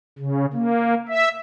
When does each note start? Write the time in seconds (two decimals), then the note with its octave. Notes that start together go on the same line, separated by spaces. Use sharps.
0.19 C#3
0.53 A#3
1.08 E5